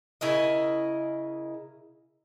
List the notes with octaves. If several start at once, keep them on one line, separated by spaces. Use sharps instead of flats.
C#3 E4 A#4 D#5